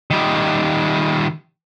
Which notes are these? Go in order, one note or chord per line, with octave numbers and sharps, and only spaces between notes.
D#3 G3